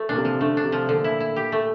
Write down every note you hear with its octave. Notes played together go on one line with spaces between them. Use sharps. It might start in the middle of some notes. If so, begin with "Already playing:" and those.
Already playing: A3
A#2 D4
C3
F3
D3 A3
D4
C3
F3
A#2 D3
E4
E4
G4
A3